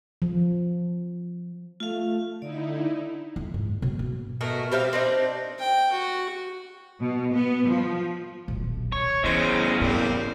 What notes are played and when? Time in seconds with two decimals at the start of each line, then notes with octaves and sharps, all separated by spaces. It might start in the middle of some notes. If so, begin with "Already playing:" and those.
0.22 F3
1.80 A3 F4 F5
2.42 D3 D#4 E4 D5
3.36 F2
3.54 G#2
3.82 B2
3.99 A#3
4.41 B2 A3 F#4 A#4
4.72 G3 C4 E5 F5
4.93 C4 D4 D#4
5.59 G5
5.92 F#4
7.01 B2
7.34 B3
7.67 F3
8.48 D#1 B1
8.92 C#5
9.24 E2 C#3 E3 C5 D#5
9.81 G#2 G3 A#3 C4